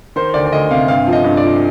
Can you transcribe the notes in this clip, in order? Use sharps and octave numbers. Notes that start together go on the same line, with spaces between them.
D#3 C5
D2 D5
D5
D2 D#5
C3 F5
G2 F5
F3
D#5
G2
D5
F3